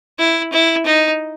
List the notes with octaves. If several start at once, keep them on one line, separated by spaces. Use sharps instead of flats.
E4
E4
D#4